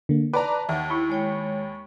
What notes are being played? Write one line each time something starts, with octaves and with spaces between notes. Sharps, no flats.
D3 A#3
B4 D5 A5 A#5 D6
D#2 E5 F#5
E4 B5 C#6
G#3 C#5 G5